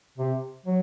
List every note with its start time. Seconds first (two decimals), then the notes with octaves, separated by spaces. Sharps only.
0.18 C3
0.65 F#3